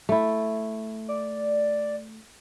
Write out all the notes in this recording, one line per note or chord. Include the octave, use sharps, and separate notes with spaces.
A3 E4
D5